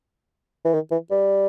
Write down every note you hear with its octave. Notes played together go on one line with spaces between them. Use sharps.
E3
D#3
E3
G3